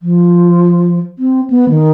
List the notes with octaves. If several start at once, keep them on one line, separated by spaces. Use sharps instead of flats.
F3
C4
B3
D#3